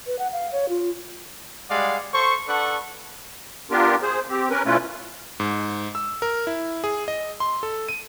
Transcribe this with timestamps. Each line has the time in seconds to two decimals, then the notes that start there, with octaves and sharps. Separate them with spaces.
0.07 B4
0.19 F#5
0.32 F5
0.52 C#5
0.69 F4
1.70 G3 G#3 D5 F5 F#5
2.13 A4 C5 C#6
2.47 D4 A4 B4 F#5 C#6
3.71 B3 D4 F4 G4 A#4
4.02 G#4 C5
4.29 C4 G4
4.50 C#4 A#4 B4
4.66 B2 A3 C#4 E4 F4 B4
5.40 G#2
5.95 E6
6.22 A#4
6.47 E4
6.84 G#4
7.08 D#5
7.40 C6
7.63 A4
7.89 D#7